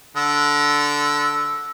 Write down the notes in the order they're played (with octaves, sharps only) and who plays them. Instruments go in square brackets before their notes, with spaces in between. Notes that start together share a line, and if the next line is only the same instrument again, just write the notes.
[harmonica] D3 E6